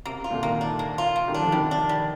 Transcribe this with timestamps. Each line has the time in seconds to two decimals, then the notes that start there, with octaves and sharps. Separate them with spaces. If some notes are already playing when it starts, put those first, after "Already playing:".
0.05 C3 A#3
0.18 C3
0.24 F4
0.30 A#2 D3
0.42 C3 D#3 A#3
0.61 D4
0.79 A#3
0.98 F4
1.16 A#3
1.28 D#3 G3
1.34 D4
1.41 D3 F3
1.52 C3 D#3 G3
1.71 D4
1.89 G3